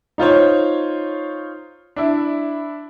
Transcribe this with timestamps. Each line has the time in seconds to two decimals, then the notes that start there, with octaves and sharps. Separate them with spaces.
0.18 D#4 F4 C5 C#5
1.96 D4 E4